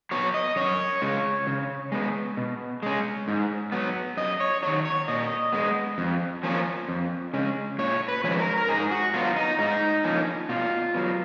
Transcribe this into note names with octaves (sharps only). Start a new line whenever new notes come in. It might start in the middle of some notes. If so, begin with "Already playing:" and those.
F#3 B3 C#5
D#5
F#2 C#5
C#3 G#3
C#3
G#3 B3
B2
G#3 C#4
G#2
F#3 B3
F#2 D#5
C#5
D#3 F#3 C#5
C#5
A#2 D#5
G#3 B3
F2
F3 A#3 C#4
F2
C#3 G#3 C#4
A#2 C#5
B4
F3 G#3 C#4 C#5
B4
A#4
A#4
G#2 G#4
F#4
F#3 B3 F4
D#4
G#2 D#4
F3 A#3 C#4
B2 F4
F#3 B3